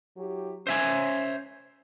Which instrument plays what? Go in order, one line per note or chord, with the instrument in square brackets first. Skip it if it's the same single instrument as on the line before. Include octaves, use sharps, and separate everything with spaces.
[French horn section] F#3 E4 G4
[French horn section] C#4 [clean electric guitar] C5 E5 G#5